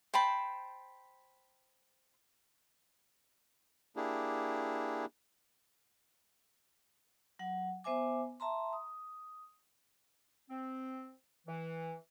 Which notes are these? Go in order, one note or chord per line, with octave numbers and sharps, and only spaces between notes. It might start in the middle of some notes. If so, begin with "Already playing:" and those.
C5 G5 A5 B5
A#3 D4 E4 G4 G#4
F#3 F#5
B3 C5 E5 G#5 D6
E5 A5 A#5 C6
D#6
C4
E3